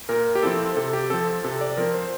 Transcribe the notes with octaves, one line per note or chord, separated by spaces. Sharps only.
A#2 A#4
G4
F3 C4 E4 A4
C3 A4
G4
F3 C4 A4
C3 A4
D5
F3 C4 A#4
C5